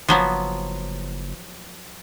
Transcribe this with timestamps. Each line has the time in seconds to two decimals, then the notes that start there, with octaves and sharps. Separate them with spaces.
0.08 F#1 F3 F#3 B3